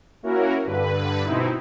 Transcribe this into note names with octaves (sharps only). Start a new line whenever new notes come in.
A#3 C#4 E4 F#4 A#4
G2 D3 B4
B2 C4 D#4 E4